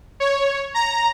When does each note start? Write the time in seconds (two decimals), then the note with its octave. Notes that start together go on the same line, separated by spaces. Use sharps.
0.20 C#5
0.74 A#5